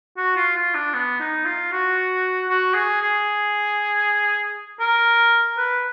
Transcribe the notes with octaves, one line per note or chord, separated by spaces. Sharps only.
F#4
F4
F4
D4
B3
D#4
F4
F#4
F#4
G#4
G#4
A#4
B4